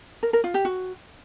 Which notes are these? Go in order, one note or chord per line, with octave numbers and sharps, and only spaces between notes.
A#4
A#4
F4
G4
F#4